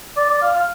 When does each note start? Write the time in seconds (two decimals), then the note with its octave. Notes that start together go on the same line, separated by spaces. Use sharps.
0.17 D5
0.29 D5
0.42 F5
0.55 F5